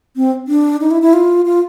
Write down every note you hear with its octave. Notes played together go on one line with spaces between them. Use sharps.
C4
D4
D#4
E4
E4
F4
F4